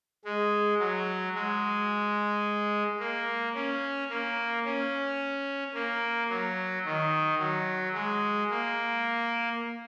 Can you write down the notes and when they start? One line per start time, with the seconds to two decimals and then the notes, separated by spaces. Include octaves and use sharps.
0.25 G#3
0.79 F#3
1.35 G#3
3.00 A#3
3.55 C#4
4.10 A#3
4.65 C#4
5.74 A#3
6.29 F#3
6.85 D#3
7.39 F#3
7.94 G#3
8.50 A#3